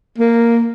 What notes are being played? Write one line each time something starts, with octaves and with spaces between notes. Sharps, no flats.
A#3